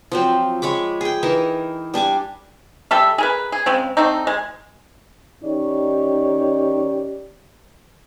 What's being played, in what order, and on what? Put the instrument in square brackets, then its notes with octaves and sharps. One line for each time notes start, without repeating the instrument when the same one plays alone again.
[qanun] F3 F#3 C4
G#3 C#5 B5 D6
G#4 G5
E3 D#4 A#4
G3 D4 G#5 D6
[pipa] G3 A4 E5
G#4 A#4 B4
G#4
C#3 G#3 C4
D3 A3 C4 D#4
G#3
[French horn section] D#3 C#4 D#4 G4 C#5 D5